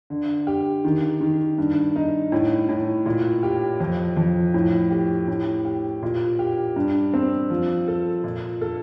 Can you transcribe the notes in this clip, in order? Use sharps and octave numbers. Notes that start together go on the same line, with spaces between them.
D3
G4
D#3
D#3
G2
D#4
A2
A2
A#2
G4
F2
F2
A2
G4
A2
G4
A#2
G4
G2
C4
F3
A4
A#2
A4